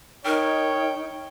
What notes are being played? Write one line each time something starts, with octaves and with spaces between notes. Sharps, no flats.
D#4 A#4 C#5 G5